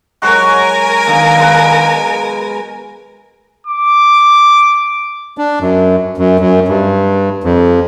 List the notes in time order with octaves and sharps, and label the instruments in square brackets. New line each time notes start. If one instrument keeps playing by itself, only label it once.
[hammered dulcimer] F#3 G#3 F#4 [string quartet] A#4 G#5
[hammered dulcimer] B2 [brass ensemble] D#3 D4 F5
[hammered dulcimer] G#3 B4
[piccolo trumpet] D6
[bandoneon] D4
F#2
F#2
F#2
G2
F2